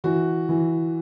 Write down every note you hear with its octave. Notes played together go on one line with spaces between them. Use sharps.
E3 F#4
E3